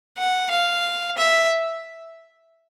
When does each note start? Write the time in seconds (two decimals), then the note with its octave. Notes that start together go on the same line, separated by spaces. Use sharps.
0.18 F#5
0.51 F5
1.18 E5